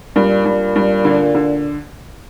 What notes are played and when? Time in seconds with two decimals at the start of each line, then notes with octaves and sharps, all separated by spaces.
0.16 G2 A#2
0.45 G2
0.75 G2
1.05 D3
1.35 D3